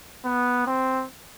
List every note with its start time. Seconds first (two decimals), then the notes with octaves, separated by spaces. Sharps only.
0.25 B3
0.66 C4